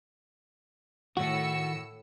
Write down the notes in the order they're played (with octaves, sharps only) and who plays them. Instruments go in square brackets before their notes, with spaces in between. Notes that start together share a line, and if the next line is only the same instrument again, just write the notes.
[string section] A2 E6 C#7 [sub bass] D#3 [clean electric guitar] F#4